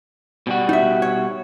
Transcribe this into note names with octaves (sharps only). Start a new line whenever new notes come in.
B2 G3 F#4
D#4 E5
C#5